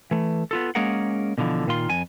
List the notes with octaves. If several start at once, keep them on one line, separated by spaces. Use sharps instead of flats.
E3 A3
B3 F4 A4
G#3 A#3 C#4 G#4 A#4 F#5
B2 D3 E3 F3
A#2 D#3 F4 C6
F2 G#5